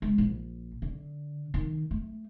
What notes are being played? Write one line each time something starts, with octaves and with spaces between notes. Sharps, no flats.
G#3
A#1
D3
D#3
A3